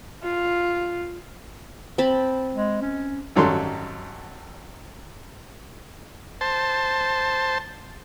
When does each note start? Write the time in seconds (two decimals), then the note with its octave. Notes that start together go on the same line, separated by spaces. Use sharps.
0.23 F4
1.98 C4 A5 B5
2.54 G#3
2.81 C#4
3.36 G#1 F#2 F#3 G3 A4 C6
6.41 C5 A5